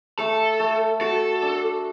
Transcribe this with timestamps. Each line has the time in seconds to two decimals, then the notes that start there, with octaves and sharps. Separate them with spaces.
0.19 A3 A4
0.60 A3
1.01 F#4 A4
1.42 D4